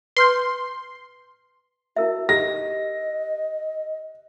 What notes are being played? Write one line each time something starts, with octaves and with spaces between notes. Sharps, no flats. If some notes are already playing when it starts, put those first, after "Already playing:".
B4 C6 F6 G6
E4 F#4 A#4 E5
G4 D#5 A#6